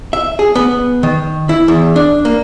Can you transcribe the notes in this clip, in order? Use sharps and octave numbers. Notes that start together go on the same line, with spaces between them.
E5
G#4
B3
D#3
E4
E2
D4
A#3